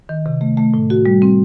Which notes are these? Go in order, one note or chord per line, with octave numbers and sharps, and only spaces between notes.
D#3
C3
A3
A3
A2
F#4
G3
C4